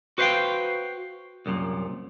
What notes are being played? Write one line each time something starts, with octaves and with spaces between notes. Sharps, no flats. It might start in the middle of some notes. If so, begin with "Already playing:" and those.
F#4 B4 C5 E5 F5 G5
C2 F#2 A#2